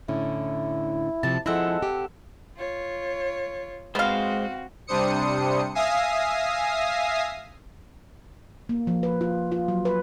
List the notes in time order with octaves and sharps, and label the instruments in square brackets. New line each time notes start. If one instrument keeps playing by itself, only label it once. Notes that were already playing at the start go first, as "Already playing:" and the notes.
[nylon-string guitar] A2 D3 C#4 [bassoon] E4
[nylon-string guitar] C3 F3 [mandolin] A5
[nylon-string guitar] F3 E4 [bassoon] G#3 [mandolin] C4 A4 F#5
[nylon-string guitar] G4
[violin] F4 C#5
[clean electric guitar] G#3 C5 [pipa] B3 F5 [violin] C4 F#4
[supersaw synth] C3 G3 D4 C5 D#6 C#7
E5 F5 G#5 D#6 A#6 C7
[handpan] A#3
F3
B4
F4
F4
F#3
B4